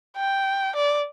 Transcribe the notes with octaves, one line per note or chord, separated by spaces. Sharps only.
G5
D5